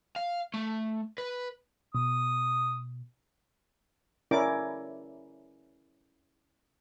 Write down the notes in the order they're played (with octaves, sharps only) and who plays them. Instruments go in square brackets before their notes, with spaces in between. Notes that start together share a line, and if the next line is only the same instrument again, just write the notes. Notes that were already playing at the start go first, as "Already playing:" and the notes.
[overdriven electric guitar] F5
A3
B4
[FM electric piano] B2 [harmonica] D#6
[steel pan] C#4 E4 A#4 D5 D6